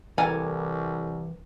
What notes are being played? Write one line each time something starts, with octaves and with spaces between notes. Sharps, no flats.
C2 E3 A4 A#4 G#5